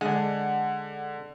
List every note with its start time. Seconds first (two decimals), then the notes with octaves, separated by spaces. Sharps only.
0.01 D3 G#3 D4 F#5